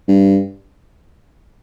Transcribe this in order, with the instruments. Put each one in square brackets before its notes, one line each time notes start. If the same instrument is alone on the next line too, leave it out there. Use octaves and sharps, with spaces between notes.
[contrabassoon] G2